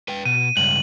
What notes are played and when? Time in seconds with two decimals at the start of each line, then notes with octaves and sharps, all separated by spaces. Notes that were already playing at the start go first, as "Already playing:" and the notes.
0.08 B4 G5
0.25 B2 D#7
0.57 C#2 G2 F#7